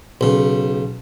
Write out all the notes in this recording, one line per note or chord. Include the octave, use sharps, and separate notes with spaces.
B1 C#3